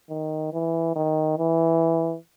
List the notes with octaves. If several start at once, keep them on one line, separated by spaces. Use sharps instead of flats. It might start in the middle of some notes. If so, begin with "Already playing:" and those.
D#3
E3
D#3
E3